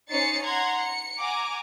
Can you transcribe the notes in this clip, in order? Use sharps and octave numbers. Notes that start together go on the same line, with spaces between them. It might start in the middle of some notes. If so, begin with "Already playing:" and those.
C#4 D#4 C5 A6 C7 C#7
F#5 A#5 C6 G#6
C#7
F#5 G#5 A#5 D6